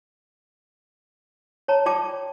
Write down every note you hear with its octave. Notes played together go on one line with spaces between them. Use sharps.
C#5 A5 A#5
F4 D5 G5 A5 D6